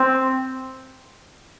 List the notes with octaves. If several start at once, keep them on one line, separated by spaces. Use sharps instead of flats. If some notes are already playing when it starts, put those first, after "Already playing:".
Already playing: C4